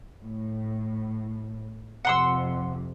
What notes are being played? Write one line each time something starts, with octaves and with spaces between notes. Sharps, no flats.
A2
F2 C3 F#5 C6 E6